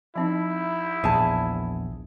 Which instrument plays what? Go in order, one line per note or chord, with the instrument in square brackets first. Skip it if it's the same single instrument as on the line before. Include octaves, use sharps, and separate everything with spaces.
[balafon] F3 C4 D#4 [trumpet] E4
[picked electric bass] A#1 E2 [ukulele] G#4 A5